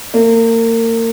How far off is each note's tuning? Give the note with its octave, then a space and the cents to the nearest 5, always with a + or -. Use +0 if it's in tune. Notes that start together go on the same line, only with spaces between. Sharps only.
A#3 -35